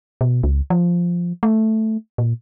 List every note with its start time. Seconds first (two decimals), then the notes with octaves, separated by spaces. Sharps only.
0.21 B2
0.43 C#2
0.70 F3
1.43 A3
2.18 A#2